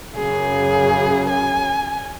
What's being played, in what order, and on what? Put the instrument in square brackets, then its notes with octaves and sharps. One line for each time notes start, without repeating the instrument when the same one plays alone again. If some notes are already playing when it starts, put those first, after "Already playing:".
[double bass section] F#2 C#3 [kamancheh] G#4
[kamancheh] G#5